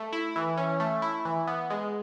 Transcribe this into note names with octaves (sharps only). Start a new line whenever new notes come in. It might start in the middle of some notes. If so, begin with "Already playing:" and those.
Already playing: A3
E4
E3
C#4
A3
E4
E3
B3
G#3